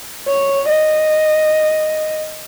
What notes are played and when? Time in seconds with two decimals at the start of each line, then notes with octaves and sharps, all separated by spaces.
0.28 C#5
0.68 D#5